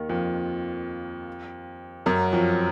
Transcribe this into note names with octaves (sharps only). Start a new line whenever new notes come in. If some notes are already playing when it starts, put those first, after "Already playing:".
Already playing: D#2 D#3
F2 F3
F#2 F#3
F2 F3